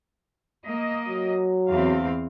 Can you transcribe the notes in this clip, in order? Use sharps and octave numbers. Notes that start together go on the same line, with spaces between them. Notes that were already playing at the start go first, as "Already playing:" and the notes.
A#3 D#5
F#3
E2 C4 F5